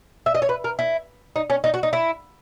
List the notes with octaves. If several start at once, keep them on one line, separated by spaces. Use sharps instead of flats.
E5
D#5
C#5
B4
A#4
E4
D#4
C#4
D#4
F#4
D#4
E4